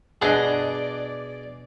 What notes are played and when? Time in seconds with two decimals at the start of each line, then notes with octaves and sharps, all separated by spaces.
0.22 B2 B3 D4 G#4 D5 D#5